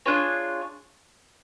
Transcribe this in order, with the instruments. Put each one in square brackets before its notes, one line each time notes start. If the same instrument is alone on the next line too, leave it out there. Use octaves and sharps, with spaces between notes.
[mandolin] D4 F4 G#4 C#5